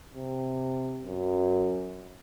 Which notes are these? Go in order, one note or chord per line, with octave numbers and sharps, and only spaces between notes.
C3
F#2